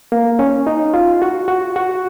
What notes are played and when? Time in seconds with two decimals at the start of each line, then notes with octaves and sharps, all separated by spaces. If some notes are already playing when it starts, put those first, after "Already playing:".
0.12 A#3
0.39 C#4
0.67 D#4
0.94 F4
1.22 F#4
1.48 F#4
1.76 F#4